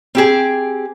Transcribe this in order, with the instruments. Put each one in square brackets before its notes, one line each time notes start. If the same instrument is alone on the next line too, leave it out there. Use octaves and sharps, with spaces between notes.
[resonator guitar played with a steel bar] C4 G4 G#4